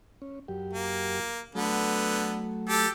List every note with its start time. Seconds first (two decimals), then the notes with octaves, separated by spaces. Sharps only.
0.22 C#4
0.48 F#2 G4
0.73 A#3
1.55 D3 F#3 A3 B3
2.69 G4 A4